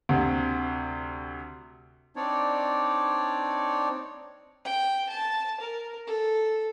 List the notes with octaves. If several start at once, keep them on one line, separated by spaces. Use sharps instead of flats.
D2 C3
C4 D4 D#4 C#5 D5
G5
A5
A#4
A4